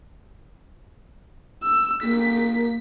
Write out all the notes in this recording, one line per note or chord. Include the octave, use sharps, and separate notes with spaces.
E6
A#3 B6